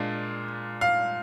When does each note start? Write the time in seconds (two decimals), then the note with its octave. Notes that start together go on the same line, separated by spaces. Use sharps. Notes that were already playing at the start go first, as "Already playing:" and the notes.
Already playing: A#2 G#3 D4 F4
0.81 F5